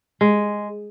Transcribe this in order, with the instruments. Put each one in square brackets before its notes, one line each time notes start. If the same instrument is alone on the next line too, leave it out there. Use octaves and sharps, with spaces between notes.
[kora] G#3